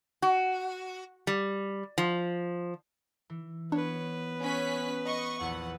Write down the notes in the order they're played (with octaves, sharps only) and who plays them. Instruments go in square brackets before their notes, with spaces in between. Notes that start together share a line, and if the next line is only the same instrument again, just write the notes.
[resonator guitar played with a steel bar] F#4
G3
F3
[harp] E3
[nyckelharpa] B3 B4 [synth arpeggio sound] D4 [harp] C#5
[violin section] C#4 F#6 B6
D#5 C#6
[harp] A#1 E2 [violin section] F#5